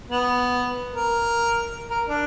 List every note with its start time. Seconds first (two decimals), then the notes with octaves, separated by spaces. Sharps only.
0.10 B3
0.92 A#4
1.90 A#4
2.08 D4